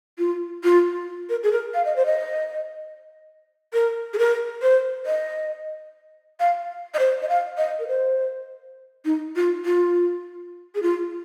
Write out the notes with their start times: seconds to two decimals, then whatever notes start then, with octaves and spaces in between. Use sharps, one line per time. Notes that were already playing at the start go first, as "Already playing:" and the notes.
0.18 F4
0.64 F4
1.29 A#4
1.43 G#4
1.52 A#4
1.74 F5
1.85 D#5
1.96 C5
2.06 D#5
3.73 A#4
4.13 G#4
4.18 A#4
4.62 C5
5.06 D#5
6.40 F5
6.94 D#5
6.99 C5
7.22 D#5
7.29 F5
7.57 D#5
7.79 A#4
7.88 C5
9.05 D#4
9.36 F4
9.65 F4
10.75 G#4
10.82 F4